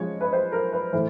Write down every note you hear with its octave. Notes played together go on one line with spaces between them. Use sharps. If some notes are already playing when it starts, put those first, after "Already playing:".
Already playing: C#3 F3 G#3 C#5
B4
C5
A#4
B4
A2 E3 A3 C5